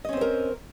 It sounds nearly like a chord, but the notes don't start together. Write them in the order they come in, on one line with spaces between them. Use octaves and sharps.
D#5 C#4 C4 C5 A#4